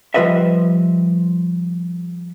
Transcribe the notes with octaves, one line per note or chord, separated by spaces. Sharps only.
F3 G3 F4 B4 D#5 E5